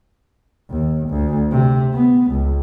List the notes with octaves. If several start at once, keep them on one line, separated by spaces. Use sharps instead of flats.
D#2
D2
C3
B3
C#2